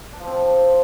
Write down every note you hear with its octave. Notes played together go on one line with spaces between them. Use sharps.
D4
F3
C4